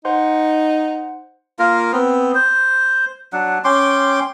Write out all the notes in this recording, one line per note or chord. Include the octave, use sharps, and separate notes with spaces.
D#4 C5 F#5 C6
A#3 F4 A#4
B3 C4
C5
F#3 D4 F#5
C#4 G5 C6 D6